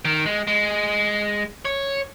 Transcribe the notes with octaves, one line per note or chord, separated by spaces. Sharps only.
D#3
G#3
G#3
C#5